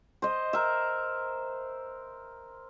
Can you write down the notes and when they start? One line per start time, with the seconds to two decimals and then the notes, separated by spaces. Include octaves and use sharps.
0.22 C5 D#5
0.53 A#4 E5